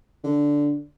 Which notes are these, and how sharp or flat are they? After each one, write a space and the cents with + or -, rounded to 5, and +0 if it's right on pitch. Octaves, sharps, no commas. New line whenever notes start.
D3 -5